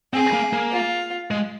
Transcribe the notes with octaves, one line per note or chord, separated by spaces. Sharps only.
C4 G#4
A#3
A#3
F4
G#3